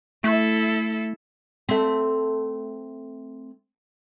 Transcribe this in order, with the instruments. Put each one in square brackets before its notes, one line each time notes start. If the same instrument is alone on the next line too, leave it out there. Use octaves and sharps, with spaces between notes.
[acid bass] A3 [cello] E4 A4
[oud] A3 C4